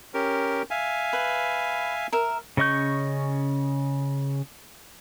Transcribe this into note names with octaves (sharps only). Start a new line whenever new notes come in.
C#4 G4 A#4
E5 F5 G#5
B4
A#4 E5
C#3 C#4 D#5 C#6 G6